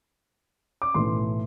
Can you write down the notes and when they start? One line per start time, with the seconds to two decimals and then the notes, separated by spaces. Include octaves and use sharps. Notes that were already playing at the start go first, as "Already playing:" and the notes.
0.82 D6
0.94 B1 A2 E3 A3 C6